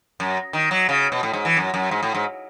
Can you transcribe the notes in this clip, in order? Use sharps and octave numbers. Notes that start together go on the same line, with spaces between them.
F#2
D#3
F#3
C#3
B2
A2
G#2
E3
F#2
F#2
G#2
A2
G#2